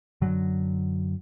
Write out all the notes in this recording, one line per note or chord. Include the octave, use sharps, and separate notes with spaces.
F#2 D3 F#3